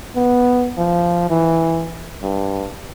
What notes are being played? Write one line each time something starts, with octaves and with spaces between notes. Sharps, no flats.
B3
F3
E3
G2